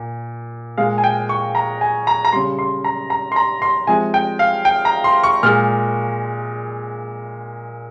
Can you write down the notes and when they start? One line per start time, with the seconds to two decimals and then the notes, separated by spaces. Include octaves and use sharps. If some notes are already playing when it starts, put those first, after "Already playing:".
Already playing: A#2
0.78 A#2 G#3 F5
0.98 G#5
1.04 G5
1.29 C#6
1.55 A#5
1.81 G#5
2.07 A#5
2.25 A#5
2.33 C#3 G3 C6
2.59 C6
2.84 A#5
3.10 A#5
3.32 C6
3.36 A#5
3.62 C6
3.87 C3 F3 G#3 G#5
4.14 G5
4.39 F5
4.65 G5
4.85 A#5
5.04 C6
5.24 C#6
5.43 A#2 G#3 F6